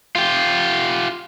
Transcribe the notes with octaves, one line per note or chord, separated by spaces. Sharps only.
F4 G4